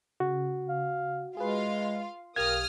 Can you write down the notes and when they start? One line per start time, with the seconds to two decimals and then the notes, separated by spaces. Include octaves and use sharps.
0.20 C#3 F#4
0.69 F5
1.37 G#3 F4 G#4 B4 F5
2.36 B1 G4 A#4 F5 D#6 F6 G#6